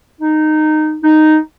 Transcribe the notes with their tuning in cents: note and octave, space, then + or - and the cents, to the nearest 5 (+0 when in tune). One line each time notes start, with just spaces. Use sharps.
D#4 -15
D#4 -5